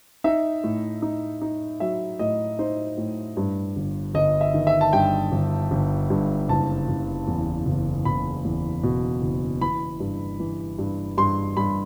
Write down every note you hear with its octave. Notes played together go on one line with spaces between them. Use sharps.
D#4 E5
A2
D#4
D#4
F#3 E5
A2 D#5
D#4 C5
A2
G2
G1
G1 D#5
E5
D#3
E5
A5
G2 G5
G1
G1
G2
F#1 A5
F#1
E2
F#1
F#1 B5
E2
B2
F#1
E3 B5
G2
E3
G2
G2 C6
G2 B5